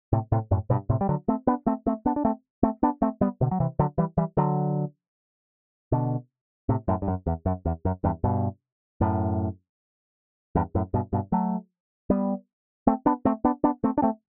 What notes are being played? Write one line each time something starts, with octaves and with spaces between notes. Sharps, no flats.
A2 C3
A2 C3
F#2 A2
G2 B2
A2 C3
G3
D3 F#3
A3 C4
B3 D4
A3 C4
A3 C4
B3 D4
D4
A3 C4
A3 C4
B3 D4
A3 C4
G3 B3
B2 D3
F#3
C3 E3
D3 F#3
E3 G3
E3 G3
D3 F#3
B2 D3
A2 C3
F#2 A2
G2
F#2
E2
F#2
E2
F#2
E2 G2
G2 B2
F#2 A2
E2 G2
F#2 A2
G2 B2
G2 B2
F#3 A3
G3 B3
A3 C4
B3 D4
A3 C4
B3 D4
B3 D4
A3 C4
D4
A3 C4